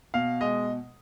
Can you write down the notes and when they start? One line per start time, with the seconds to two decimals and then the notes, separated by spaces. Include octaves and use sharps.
0.14 B2 F5
0.41 G#3 D#5